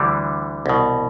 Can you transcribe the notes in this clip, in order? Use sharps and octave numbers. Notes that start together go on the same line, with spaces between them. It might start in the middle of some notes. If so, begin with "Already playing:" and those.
Already playing: D2 D3 E3 G3
C2 B2